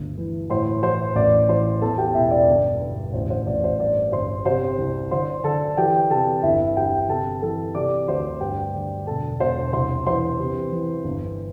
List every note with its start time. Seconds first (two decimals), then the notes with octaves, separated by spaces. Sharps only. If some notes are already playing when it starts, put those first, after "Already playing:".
Already playing: G1 D2
0.18 E3
0.50 A2 C5 C6
0.83 E3 C5 C6
1.16 A1 D5 D6
1.48 E3 C5 C6
1.82 E2 A4 A5
1.98 G4 G5
2.14 E1 E4 E5
2.31 D5
2.48 G1
2.81 G2
3.14 A1 C5
3.30 C5
3.47 A1 D5
3.64 C5
3.80 G2 D5
4.12 G1 C5 C6
4.45 C3 C5 C6
4.78 C2
5.11 D3 C5 C6
5.44 D3 A4 A5
5.77 E3 G4 G5
6.10 C3 A4 A5
6.43 G1 E4 E5
6.77 G1 G4 G5
7.09 C3 A4 A5
7.42 E3 A4 A5
7.75 C3 D5 D6
8.08 D2 C5 C6
8.41 G2 G4 G5
8.74 D3
9.07 E1 A4 A5
9.40 E1 C5 C6
9.73 C2 C5 C6
10.07 E3 C5 C6
10.39 C3
10.72 E3
11.04 G1